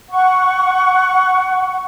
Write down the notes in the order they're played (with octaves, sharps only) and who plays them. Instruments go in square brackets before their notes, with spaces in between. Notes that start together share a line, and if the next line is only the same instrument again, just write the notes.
[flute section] F#5 C#6